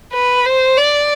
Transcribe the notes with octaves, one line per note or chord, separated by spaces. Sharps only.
B4
C5
D5